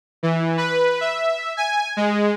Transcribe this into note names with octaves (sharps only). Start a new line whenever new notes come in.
E3
B4
E5
G#5
G#3